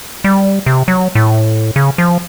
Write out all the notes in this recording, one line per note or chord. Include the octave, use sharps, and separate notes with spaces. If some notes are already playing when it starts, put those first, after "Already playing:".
G3
C3
F#3
A2
C#3
F3